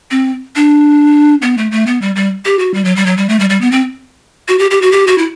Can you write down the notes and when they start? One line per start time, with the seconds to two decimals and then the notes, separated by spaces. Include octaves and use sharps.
0.11 C4
0.56 D4
1.42 B3
1.58 A3
1.72 A3
1.87 B3
2.02 G3
2.16 G3
2.45 G4
2.59 F#4
2.74 G3
2.85 F#3
2.96 G3
3.06 F#3
3.17 G3
3.29 A3
3.40 G3
3.50 G3
3.61 B3
3.72 C4
4.48 F#4
4.59 G4
4.71 G4
4.82 F#4
4.92 G4
5.07 F#4
5.18 E4